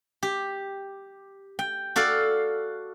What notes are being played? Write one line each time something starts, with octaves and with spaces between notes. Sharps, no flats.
G4
G5
F#4 A4 D5 F5